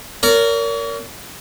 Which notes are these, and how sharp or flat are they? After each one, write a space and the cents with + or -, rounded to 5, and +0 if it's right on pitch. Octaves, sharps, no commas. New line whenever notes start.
A#4 -10 C#5 +45